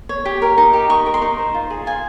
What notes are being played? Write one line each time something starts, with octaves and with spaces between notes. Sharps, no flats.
C#5
G4
A#4
D#4
G4
D#5 C#6
A#4
C6
D#4
C5
F4
G#4
F4 G#5